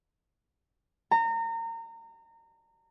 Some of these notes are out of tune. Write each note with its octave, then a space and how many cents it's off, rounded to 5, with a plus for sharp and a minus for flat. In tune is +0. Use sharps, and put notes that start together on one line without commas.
A#5 -30